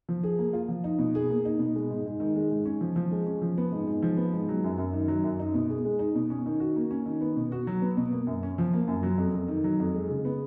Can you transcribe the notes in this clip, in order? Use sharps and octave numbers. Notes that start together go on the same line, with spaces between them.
F3
G#4
A#3
F4
F3
D#4
B2
G#4
A#3
D#4
B2
G#3
G#2
G#2
D#3
G#3
G#2
C#4
F3
F3
G#3
C#4
F3
B3
G#2
G#2
F3
B3
G#2
F#3
F#2
F#2
D#3
F#3
F#2
D#4
B2
G#4
G#3
D#4
B2
C#4
D#3
F#4
A#3
C#4
D#3
B3
B2
F#4
F#3
B3
B2
A#3
F#2
C#4
F3
A#3
F#2
F#3
F2
F2
D#3
F#3
F2
G#3
C#3
B3